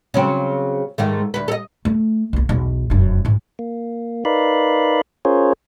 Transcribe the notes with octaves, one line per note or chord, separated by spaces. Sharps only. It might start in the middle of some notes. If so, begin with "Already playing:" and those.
C#3 F#3 C4
G#2 D#3 A3
D2 B4
A4 D#5
A3
C2 A#3
B1 E2
F1 F#2
G#2 E3
A#3
D#4 A#4 B4 D5 F5 B5
C#4 F4 G#4 A#4 C5 C#5